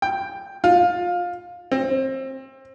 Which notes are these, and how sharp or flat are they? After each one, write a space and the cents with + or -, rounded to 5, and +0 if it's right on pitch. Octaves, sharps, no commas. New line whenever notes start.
G5 +5
F4 +20
C4 +25